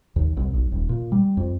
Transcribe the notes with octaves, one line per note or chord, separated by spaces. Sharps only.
D#2
C2
B1
D#1
A#2
G3
F2